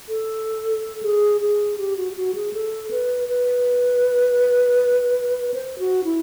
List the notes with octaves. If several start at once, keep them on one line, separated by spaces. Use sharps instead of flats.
A4
G#4
G#4
G4
F#4
G4
F#4
G#4
A4
B4
B4
C5
F#4
E4